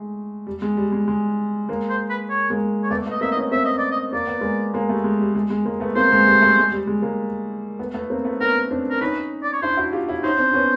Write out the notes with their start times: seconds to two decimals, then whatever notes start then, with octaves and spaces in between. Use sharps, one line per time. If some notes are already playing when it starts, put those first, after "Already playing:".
Already playing: G#3 A3
0.47 G3
0.62 G#3
0.77 G3
0.92 G#3
1.08 G#3
1.69 G#3 A#3
1.90 C5
2.10 B4
2.30 C#5
2.50 G#3 A#3
2.83 C#5
2.90 A3 B3 D5
3.06 A3 B3
3.11 D#5
3.21 A#3 C4 E5
3.32 D#5
3.36 B3 C#4
3.51 A#3 C4 E5
3.65 D#5
3.78 D5
3.91 D#5
4.13 A#3 D5
4.27 B3
4.41 G#3 A#3
4.74 G#3 A#3
4.89 G3 A3
5.04 G#3
5.20 G3
5.35 G#3
5.50 G#3
5.65 G#3 A#3
5.80 A3 B3
5.95 A#3 C4 C5
6.11 G#3 A#3
6.27 G3 A3
6.41 G3 A3
6.58 G#3
6.72 G3
6.87 G#3
7.02 G#3 A#3
7.79 A3 B3
7.94 A3 B3
8.10 A#3 C4
8.25 A3 B3
8.41 B3 C#4 A#4
8.71 C4 D4
8.89 A#4
9.01 C#4 D#4 B4
9.43 D5
9.53 C#5
9.62 D4 E4 C5
9.77 E4 F#4
9.93 F4 G4
10.08 E4 F#4
10.23 C#4 D#4 C5
10.38 C4 D4
10.53 B3 C#4